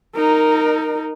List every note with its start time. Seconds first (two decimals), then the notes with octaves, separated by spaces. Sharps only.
0.15 D#4 A#4